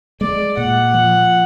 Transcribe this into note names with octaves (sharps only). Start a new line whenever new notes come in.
G#3 D5
A#2 F#5
F3